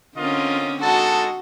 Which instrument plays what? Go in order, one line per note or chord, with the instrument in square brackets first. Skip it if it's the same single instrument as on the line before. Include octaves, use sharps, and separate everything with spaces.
[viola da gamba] D3 C4 C#4 [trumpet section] F4 A#4 D#5
[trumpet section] G#3 D#4 A4 [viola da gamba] F#4 [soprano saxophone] A5